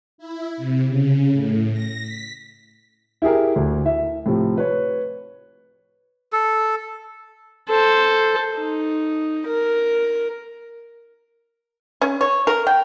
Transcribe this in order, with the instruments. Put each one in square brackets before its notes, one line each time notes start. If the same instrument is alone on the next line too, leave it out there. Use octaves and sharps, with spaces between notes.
[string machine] E4
C3
C#3
A2
A#6
B6
[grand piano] E4 G4 G#4 A#4
D2
E4 E5
A2 C3 F3
B4 C#5
[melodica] A4
[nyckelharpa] A4 C5
D#4
A#4
[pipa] C#4
C#5
A#4
G5